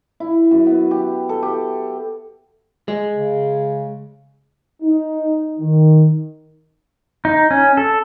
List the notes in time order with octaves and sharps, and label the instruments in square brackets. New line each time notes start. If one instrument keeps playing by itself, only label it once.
[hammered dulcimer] E4
F#2
B3
G4
A4
G4
[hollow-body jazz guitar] G#3
[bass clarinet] C#3
[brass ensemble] D#4
D#3
[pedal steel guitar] D#4
C#4
A4